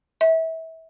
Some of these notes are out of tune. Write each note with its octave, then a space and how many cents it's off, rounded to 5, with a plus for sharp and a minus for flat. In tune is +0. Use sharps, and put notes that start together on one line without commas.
E5 -30